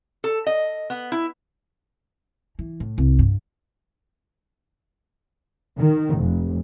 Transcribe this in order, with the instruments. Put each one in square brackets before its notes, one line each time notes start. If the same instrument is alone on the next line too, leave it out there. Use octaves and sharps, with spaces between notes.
[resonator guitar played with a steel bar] A4
D#5
B3
E4
[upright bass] E3
A2
C2
G2
[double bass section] D#3
F1